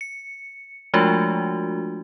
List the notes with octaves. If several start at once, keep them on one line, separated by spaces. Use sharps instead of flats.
C#7
F3 G#3 A3 D4 F4 F#4